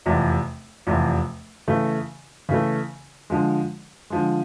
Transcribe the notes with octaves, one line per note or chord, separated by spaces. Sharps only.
F1 E2 C3 F3
F1 E2 C3 F3
C#3 E3 A3
C#3 E3 A3
D3 F3 G#3
D3 F3 G#3